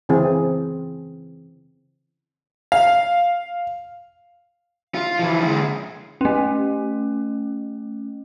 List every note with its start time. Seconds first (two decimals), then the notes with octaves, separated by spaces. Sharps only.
0.09 C#3 E3 C4 G#4
2.72 F5
4.95 F4
5.19 E3 F3
5.41 D3 G#3
6.21 A3 C#4